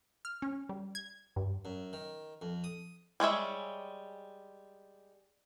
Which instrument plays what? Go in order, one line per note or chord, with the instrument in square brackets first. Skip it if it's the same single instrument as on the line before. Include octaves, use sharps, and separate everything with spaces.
[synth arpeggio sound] F6
C#4
G3
G#6
G2
[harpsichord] F#2
D#3
F2
D#6
[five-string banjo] G3 G#3 C#5 E5